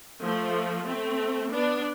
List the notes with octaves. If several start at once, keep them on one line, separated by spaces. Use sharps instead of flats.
F3 A3
A3 C4
B3 D4